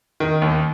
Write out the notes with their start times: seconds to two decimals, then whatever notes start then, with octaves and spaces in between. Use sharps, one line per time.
0.20 D#3
0.42 D#2